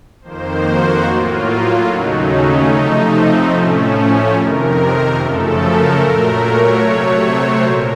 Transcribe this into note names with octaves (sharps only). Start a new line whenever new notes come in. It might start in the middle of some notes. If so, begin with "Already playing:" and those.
F2 D#3 A#3 C5
F#4
A2 F#3 A#3 F4
D#2 C#3 F#3 A3 D#4
C#4
C3 F3 A3 D#4
C4
A2 F3 A3 C#4
C#4
F2 C3 D#3 A#4
F#2 C#3 F3 A3 A4
A#4
A#2 F#3 A3 A#4
C#5
C3 F#3 A3
C5
A#2 A#4